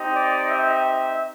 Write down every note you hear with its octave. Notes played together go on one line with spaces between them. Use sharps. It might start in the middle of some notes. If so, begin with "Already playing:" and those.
Already playing: C4 D#4 G4
D5
E5